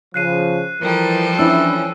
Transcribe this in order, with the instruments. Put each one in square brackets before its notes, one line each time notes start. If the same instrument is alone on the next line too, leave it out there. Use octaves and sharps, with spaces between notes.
[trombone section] C#3 F3 [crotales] F#6 C7 D#7
[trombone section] E3 A#4 [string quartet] F3 G3 A4
[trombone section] E3 C#4 [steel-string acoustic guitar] D4 E4 [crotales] E6